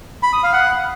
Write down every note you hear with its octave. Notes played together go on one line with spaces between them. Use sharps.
B5
D#6
F5
F#5